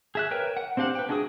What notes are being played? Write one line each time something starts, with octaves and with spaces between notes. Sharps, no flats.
G#4 E5 F#6
A#4 B4 C#5 E5 G5
F#5
C4 D4 G4 F5 F#5
B4 G5
G#3 D4 F#4 G#4 D#6